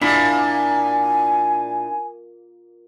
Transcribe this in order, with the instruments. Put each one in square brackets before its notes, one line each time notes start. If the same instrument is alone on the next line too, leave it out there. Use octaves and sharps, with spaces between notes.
[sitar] A#2 [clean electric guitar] D4 E4 B5 [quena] G#5